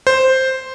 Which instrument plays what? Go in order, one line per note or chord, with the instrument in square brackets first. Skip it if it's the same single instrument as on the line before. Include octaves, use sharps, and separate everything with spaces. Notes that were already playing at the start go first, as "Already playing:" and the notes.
[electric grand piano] C5